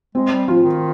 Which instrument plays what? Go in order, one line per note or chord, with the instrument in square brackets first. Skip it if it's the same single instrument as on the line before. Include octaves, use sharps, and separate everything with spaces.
[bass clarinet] G#3 [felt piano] C4
[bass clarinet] G3
[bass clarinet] F3 [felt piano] F4
[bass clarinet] D#3